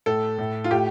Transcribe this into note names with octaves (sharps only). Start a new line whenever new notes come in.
A2 A4
A2
F4
A2 G4